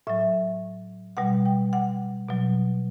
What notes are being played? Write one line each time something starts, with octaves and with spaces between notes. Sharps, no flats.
A2 F#3 E5
B2 G3 F#5
G5
F#5
B2 F#3